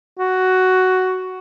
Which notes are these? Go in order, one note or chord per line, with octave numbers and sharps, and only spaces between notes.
F#4